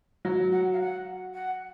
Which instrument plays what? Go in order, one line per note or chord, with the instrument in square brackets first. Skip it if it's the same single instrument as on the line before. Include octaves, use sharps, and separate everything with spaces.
[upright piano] F#3
[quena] F#5
F5
F#5
F#5